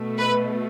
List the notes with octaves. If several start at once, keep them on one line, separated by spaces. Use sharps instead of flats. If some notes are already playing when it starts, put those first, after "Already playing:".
Already playing: B2 A3
B4